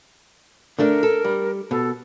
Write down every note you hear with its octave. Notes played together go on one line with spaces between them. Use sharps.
D3 A3 D4 A#4
A4
G3
B2 A4